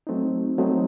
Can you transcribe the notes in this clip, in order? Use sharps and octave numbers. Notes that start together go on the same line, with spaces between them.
F#3 A3 C4 D#4
F#3 A3 C4 D#4